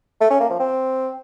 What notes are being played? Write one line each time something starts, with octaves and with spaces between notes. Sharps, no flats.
A3
C#4
A#3
F3
C4